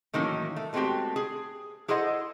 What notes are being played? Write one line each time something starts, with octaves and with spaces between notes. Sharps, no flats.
A2 D#3 E3 F#3 A#3 C#4
A3
G#3 A3 B3 C4 F#4 G4
G#4
E4 G#4 A4 C5 D#5 F#5